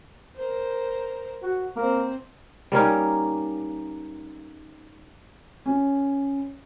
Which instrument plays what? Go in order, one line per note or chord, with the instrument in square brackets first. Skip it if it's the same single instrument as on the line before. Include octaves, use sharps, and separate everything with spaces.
[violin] A#4 C5
[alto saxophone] F#4
[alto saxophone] A#3 [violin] C4 C5
[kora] G3 A#3 C#4 D#4
[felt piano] C#4